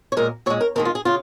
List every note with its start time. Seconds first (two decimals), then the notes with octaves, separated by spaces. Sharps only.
0.12 C#5
0.17 A#2 G#3 A#4
0.46 A#2 C#5
0.50 G#3
0.61 A#4
0.76 D#2 D#3 G#3 A#4
0.85 F4
0.95 G#4
1.05 C#3 F4